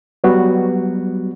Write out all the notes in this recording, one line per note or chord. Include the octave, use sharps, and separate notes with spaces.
F#3 G3 B3 F#4